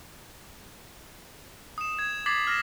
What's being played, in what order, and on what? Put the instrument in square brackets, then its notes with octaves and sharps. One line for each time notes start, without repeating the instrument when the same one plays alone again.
[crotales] D#6 E7
G#6
D6 G#6 A6 B6 C7 F#7
F6 A#6 E7